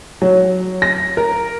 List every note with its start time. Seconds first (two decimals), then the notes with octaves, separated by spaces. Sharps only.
0.22 F#3
0.82 A#6
1.17 A#4